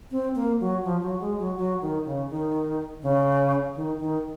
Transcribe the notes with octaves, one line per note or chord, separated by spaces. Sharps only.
C4
A#3
F#3
F3
F#3
G#3
F#3
F#3
D#3
C#3
D#3
C#3
D#3
D#3